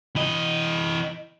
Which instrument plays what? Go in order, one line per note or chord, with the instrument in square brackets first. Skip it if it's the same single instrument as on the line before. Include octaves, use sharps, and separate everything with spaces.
[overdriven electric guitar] E3 D#5